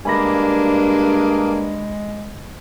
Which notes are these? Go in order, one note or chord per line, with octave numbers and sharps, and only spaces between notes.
G2 G#3 A#3 D4 G#4 G#5 B5 A#6